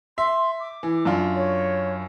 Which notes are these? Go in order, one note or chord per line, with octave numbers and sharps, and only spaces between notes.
E5 C6
D6
E3
F#2 D4 F4
C#5